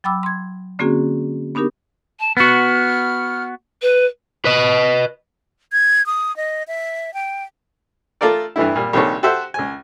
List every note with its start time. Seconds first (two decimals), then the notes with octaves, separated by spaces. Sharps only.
0.04 F#3 G5 B5 D6 E6
0.23 C6 G#6
0.79 D3 A#3 C4 C#4 F#4 G#4
1.55 B3 D4 D#4 G4 A#4
2.20 A5
2.37 B3 F#4 F6
3.82 B4
4.45 B4 D#5
5.72 G#6
6.06 D#6
6.36 D#5
6.68 E5
7.14 G5
8.21 A3 F4 A4 A#4 D5
8.56 G2 E3 A3 E4
8.75 A#2 G3
8.93 A#1 C3 D#3 G3 A4 C#5
9.23 F#4 G4 A4 C5 E5
9.54 C#2 G#5